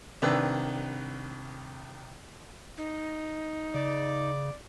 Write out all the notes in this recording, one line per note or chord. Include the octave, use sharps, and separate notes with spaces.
C2 D#3 D4 B4 E6
D#4
C#3 D5